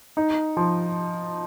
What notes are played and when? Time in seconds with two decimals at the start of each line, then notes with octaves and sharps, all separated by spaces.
0.17 D#4
0.57 F3